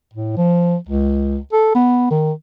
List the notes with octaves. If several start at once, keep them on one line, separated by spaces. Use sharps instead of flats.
A2
F3
C#2
A4
B3
D#3